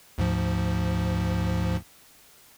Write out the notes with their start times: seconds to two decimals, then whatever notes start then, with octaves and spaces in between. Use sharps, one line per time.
0.18 D2 G#2 F3